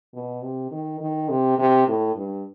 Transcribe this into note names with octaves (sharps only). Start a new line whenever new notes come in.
B2
C3
D#3
D#3
C3
C3
A2
G2